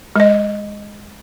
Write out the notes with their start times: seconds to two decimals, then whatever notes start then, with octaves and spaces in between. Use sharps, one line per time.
0.16 G#3 D#5